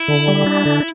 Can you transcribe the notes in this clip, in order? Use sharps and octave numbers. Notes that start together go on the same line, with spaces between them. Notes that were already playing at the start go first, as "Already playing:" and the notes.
Already playing: E4
D3
G3
D4
D3